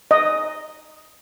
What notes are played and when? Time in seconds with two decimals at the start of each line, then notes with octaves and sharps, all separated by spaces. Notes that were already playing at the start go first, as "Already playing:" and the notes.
0.11 D#5